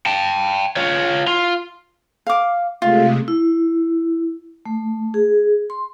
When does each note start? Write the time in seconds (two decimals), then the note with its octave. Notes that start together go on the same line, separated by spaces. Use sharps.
0.06 G5 A5
0.76 F4 C#5
1.27 F4
2.27 F5 D6
2.82 C3 G#3 A3 F4
3.28 E4
4.66 A3
5.14 G#4
5.70 C6